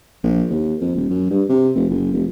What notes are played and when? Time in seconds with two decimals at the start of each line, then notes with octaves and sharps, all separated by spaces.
0.23 A#1
0.50 D#2
0.81 F2
0.95 D#1
1.09 F#2
1.30 G2
1.49 C3
1.75 F1
1.89 F#1
2.12 F1